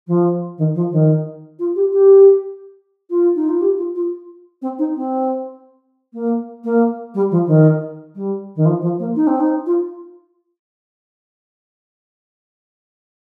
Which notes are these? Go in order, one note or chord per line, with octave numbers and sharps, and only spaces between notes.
F3
D#3
F3
D#3
F4
G4
G4
F4
D#4
F4
G4
F4
F4
C4
D#4
C4
A#3
A#3
G3
F3
D#3
G3
D#3
F3
F3
A#3
D#4
C4
D#4
F4